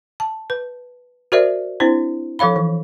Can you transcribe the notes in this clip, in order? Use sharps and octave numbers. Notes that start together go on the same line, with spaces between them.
A5
B4
F#4 A#4 C5 D5 E5
C4 D4 E4 C5
F3 A4 C#5 F5 B5
E3